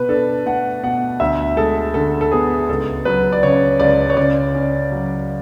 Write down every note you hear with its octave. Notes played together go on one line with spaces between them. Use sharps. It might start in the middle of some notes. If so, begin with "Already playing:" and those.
Already playing: B2 B4
D4 A4
A3 F#5
B2 F#5
D2 E5
G#3 A4
D3 A4
A4
B3 G#4
C#2 A4
F#3 B4
D5
C#3 C#5
C#2 D5
C#5
C#3 D5
C#4
F#3